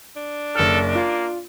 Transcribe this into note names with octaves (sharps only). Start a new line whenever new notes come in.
D4
F#1 A4 F6
A#3 F4